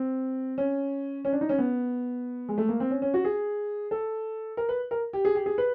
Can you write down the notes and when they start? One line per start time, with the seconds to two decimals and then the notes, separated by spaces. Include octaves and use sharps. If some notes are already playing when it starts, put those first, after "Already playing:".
Already playing: C4
0.58 C#4
1.25 C#4
1.33 D4
1.41 D#4
1.49 C#4
1.58 B3
2.49 G#3
2.58 A3
2.69 A#3
2.80 C4
2.91 C#4
3.02 C#4
3.14 F#4
3.25 G#4
3.91 A4
4.57 A#4
4.69 B4
4.91 A#4
5.13 G4
5.25 G#4
5.35 G4
5.46 G#4
5.58 B4